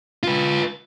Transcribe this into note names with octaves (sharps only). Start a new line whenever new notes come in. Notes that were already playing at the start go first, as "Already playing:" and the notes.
F4 B4